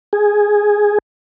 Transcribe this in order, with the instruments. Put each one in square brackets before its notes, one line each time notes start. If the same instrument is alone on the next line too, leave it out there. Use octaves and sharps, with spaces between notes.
[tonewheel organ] G#4